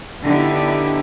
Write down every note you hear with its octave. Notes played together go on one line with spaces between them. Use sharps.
D3 B3 D#4 E4 G4